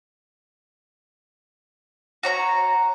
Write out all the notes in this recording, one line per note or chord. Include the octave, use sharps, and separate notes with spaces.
F#4 C#5 A#5